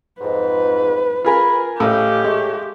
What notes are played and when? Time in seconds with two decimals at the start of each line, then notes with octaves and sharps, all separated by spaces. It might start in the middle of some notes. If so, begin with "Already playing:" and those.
0.21 F2 G#2 B4
1.25 F4 G#4 A#4 B5
1.80 A2 C#4 G4 D#5 F5
2.24 G#3 A3 C#5